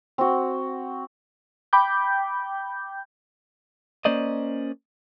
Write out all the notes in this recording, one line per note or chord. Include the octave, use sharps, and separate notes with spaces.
C4 F#4
G5 B5 D6 G6
A#3 C#4 C5 D5 D#5